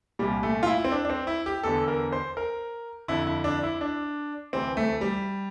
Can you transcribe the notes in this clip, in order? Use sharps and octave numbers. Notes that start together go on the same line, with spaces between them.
C2 A#2 G3
A3
F4
E4
C4
D4
D4
C4
E4
G4
E2 D3 A4
A#4
C5
A#4
F2 D3 E4
E4
D4
E4
D4
D2 C3 E3 C4
A3
G3